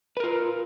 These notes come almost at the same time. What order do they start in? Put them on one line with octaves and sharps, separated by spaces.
B4 A#4 F4